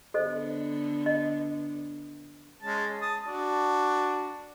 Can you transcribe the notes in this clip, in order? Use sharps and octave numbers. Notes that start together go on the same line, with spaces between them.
D3 B3 D4 A4 C5 D#5
D#5
G#3 C#4 A5
A5 D#6
D4 F#4